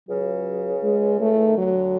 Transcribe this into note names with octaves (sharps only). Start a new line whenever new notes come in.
C#2 C#3 F#3
G#3
A3
E3
D#3
D2 D3 F#3